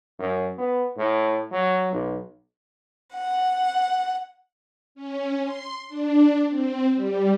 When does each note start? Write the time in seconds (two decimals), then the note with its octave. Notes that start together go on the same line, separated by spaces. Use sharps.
0.19 F#2
0.58 B3
0.97 A2
1.52 F#3
1.93 B1
3.15 F#5
4.95 C#4
5.42 C6
5.88 D4
6.48 C4
6.94 G3